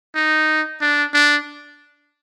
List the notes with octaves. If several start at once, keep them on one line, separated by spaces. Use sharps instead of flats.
D#4
D4
D4